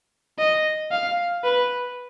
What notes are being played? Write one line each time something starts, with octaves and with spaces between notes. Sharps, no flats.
D#5
F5
B4